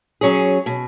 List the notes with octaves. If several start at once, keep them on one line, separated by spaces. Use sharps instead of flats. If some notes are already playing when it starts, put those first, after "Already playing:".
F#3 C#4 G#4
B2